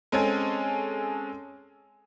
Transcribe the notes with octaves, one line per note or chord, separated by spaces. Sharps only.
G#3 C4 C#4 G#4 A4 G#5